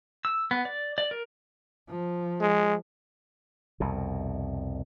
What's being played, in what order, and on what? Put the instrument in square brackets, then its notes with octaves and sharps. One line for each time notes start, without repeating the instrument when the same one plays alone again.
[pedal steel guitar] E6
B3
D5
D5
A#4
[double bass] F3
[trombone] G#3
[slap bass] C2 F2 B2